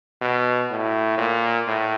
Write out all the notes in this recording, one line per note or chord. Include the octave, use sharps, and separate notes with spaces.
B2
A2
A#2
A2